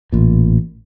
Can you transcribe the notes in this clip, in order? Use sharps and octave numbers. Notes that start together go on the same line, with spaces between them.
A1 A#2